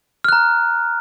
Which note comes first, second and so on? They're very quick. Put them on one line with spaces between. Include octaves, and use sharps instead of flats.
F6 F#6 A#5